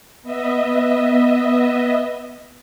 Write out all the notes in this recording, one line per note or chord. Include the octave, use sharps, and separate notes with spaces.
B3 D#5 E5